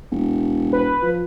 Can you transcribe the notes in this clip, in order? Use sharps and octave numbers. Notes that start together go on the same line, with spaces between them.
E1
B4
F3